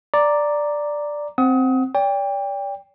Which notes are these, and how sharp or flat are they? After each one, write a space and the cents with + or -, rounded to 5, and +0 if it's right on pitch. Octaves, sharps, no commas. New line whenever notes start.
D5 +0 A#5 +0
C4 +0 F#5 +0 D#6 +30
D5 -40 G5 +25